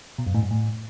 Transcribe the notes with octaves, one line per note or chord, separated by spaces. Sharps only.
B2
F#2
A2
G2
A2